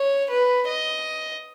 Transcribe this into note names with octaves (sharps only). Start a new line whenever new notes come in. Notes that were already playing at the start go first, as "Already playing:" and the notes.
Already playing: C#5
B4
D#5